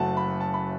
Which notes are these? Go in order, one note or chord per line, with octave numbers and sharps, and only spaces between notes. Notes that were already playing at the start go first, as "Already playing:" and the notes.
Already playing: F#1 F#2 F#3 A3 F#5 A5
B5
A5
B5